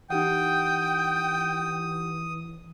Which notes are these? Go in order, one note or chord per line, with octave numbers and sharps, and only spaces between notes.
E3 D#4 G4 F#5 G5 D#6